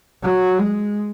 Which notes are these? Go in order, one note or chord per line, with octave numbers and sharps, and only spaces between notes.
F#3
G#3